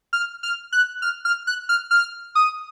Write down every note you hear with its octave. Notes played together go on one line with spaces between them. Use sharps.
F6
F6
F#6
F6
F6
F#6
F6
F6
D#6